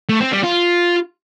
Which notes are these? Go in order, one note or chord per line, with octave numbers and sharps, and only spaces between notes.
A3
C4
G3
F4